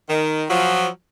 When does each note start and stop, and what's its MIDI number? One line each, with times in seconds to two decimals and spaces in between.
0.08 0.44 51
0.49 0.87 53
0.49 0.87 54